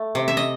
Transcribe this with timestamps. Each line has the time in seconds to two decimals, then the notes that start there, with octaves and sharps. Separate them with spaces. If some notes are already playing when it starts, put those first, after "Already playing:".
Already playing: A3
0.15 C3
0.28 E5
0.37 D#5